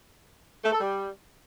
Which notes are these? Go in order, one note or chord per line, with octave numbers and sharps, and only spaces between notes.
A3
A4
G3